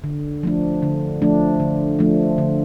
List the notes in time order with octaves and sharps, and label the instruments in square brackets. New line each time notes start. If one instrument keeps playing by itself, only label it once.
[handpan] D3
F3 A3 D4
D3
F3 A3 D4
D3
F3 A3 D4
D3